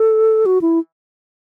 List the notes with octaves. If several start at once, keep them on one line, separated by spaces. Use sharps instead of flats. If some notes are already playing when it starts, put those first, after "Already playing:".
Already playing: A4
F#4
E4